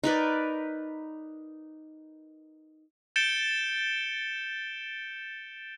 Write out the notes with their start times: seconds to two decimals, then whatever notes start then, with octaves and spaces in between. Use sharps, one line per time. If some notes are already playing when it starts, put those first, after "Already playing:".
0.04 D#4 A#4 B4 D5
3.16 G6 A6 C#7 D7 E7 G7